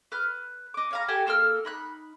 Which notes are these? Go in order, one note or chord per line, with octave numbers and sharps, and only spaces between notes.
B4 F6 G6
D#5 D6
C#5 F5 A#5
G4 A4 F#5 G#5
A#3 A4 E6 F6
D#4 B5 F#6